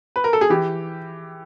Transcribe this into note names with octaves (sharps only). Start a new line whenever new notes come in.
B4
A#4
A4
G#4
E3 G4